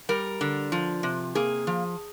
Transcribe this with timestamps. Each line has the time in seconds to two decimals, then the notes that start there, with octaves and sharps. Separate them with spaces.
0.09 G3 A#4
0.41 D3
0.72 F3
1.03 C3
1.35 A#3 G#4
1.67 F3